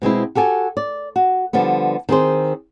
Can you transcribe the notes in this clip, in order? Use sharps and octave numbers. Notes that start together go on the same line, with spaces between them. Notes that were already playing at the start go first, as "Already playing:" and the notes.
B2 G#3 C4 E4
F#4 G4 A4 G#5
D5
F#4
D3 F3 G3 B3
D#3 C4 G#4 C5